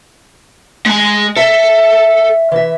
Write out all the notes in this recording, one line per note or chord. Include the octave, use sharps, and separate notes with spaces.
G#3 G#5
A4 E5
E3 E5